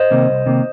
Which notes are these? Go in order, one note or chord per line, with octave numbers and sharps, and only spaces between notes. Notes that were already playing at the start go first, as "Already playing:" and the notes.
Already playing: C5 D#5
C3 D#3 A#3
C2
C3 D#3 A#3